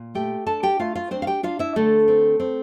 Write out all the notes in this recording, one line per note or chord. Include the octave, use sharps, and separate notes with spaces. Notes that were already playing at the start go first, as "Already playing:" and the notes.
Already playing: A#2
A3 G4 G5
D4 A4 A5
G4 G5
A3 F4 F5
F4 F5
C4 D4 C5
F5
G4 G5
D4 F4 F5
E4 E5
D3 A3 A4
C4
C4